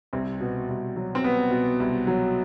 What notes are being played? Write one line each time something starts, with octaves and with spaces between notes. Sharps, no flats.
C2 C4
B2
C2
F#3
C4
C2 B3
B2
C2
F#3